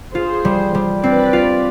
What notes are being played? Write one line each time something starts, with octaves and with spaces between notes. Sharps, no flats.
F4 G#4 C5
G3
G3
C4 B4 D5
F4